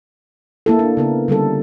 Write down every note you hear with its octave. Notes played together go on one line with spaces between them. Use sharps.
A#3 E4 A4
D4
C#3 B3 A#4
D3 G3 C#4 A4